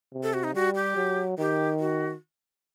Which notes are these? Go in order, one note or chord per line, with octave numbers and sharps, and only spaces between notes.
C3
A4
F#4
D#4
G3 F#4
G4
F#3
D#3 G4
F#4